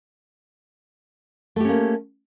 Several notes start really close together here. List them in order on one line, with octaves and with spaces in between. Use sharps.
A3 G4 C#4 A#3